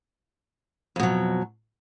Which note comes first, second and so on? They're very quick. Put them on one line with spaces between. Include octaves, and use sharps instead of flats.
F2 B2 F#3